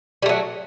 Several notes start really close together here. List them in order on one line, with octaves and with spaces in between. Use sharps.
G3 A3 F#3